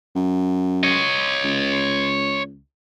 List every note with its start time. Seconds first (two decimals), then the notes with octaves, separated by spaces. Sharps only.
0.15 F#2
0.83 C#5 D#5
1.44 C#2